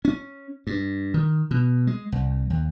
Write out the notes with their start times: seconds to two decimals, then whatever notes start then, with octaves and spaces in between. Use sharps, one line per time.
0.05 C#4
0.67 G2
1.14 D#3
1.51 B2
1.87 G#3
2.12 C2
2.50 D#2